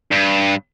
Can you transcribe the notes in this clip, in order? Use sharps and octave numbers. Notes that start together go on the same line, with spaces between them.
G2